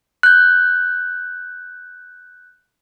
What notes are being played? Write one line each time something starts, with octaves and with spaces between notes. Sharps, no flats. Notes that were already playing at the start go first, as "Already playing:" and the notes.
F#6 G6